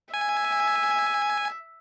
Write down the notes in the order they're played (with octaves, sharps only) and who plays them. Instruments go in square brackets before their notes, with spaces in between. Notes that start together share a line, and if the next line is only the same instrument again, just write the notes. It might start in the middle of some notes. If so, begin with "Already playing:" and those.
[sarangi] E5 [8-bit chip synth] G#5